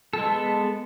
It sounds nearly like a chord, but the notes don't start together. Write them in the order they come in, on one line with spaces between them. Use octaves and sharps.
A4 G#3 B3